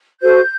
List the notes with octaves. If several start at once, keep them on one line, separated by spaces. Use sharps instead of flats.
F#4 A4 C5 G6